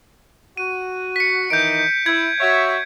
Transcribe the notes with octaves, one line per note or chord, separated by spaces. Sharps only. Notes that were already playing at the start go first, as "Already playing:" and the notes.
F#4 D#7
B6 C#7
D#3 E3 D#4 G6 D7
E4 G#6
F#4 C#5 E5